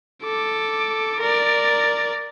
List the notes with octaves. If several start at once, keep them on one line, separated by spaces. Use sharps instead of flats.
A4 D6
A#4 D5